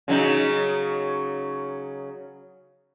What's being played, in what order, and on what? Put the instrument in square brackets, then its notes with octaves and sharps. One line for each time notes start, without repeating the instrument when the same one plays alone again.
[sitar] C#3 F#3 D#4